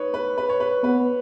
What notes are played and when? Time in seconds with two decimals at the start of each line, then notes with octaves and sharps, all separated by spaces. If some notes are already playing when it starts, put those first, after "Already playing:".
Already playing: D#4 B4 C#5
0.14 B4
0.38 B4
0.50 C#5
0.60 B4
0.83 B3 B4